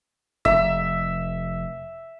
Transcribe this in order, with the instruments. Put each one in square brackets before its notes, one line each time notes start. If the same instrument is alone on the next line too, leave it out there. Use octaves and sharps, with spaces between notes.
[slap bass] F1 [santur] E5